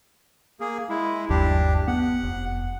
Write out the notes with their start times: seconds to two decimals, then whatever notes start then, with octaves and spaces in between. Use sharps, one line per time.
0.60 A#3 G#4
0.89 G#3 E4
1.29 G1 D#2 F#3 D4 G4
1.88 B3 F#5
2.23 F1